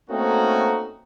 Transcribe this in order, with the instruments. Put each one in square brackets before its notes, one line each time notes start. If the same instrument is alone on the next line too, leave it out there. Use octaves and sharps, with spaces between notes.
[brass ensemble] A3 A#3 C4 C#4 D#4 F#4